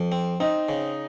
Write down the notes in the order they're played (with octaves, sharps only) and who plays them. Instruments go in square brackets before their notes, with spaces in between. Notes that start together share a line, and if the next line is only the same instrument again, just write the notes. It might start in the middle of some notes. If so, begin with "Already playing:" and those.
Already playing: [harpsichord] F2
C4
[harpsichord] C4 [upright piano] D#4
[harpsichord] C#3